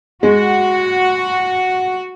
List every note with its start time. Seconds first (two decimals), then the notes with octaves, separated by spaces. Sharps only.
0.23 G#3 F#4